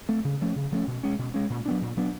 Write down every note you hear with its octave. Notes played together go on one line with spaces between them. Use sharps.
A3 C4
C#3
F3 A3 C#4
C#3
F3 A3 C#4
B2
G#3 C#4
B2
G#3 C#4
A#2
F#3 B3 D4
A#2
F#3 B3 D4